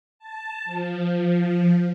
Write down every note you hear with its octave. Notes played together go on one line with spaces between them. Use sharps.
A5
F3